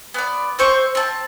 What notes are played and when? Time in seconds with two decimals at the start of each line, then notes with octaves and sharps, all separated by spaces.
0.14 B3 D5
0.59 C4 C5 C#6
0.95 C4 A5